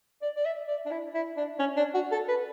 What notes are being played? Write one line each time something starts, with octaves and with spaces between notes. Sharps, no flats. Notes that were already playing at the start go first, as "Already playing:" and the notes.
D5
D5
E5
D5
D4
E4
E4
D4
C#4
D4
F#4
A4
B4